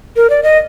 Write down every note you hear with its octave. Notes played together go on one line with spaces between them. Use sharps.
A#4
D5
D#5